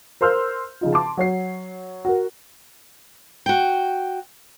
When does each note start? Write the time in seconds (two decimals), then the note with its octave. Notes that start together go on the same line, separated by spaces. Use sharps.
0.21 A#4 C5 C6 E6 F6 G6
0.81 C#3 F3 D#4 F4
0.93 A5 C6 D6
1.17 F#3 C#5 C7
2.05 F#4 A#4
3.46 F#4 G5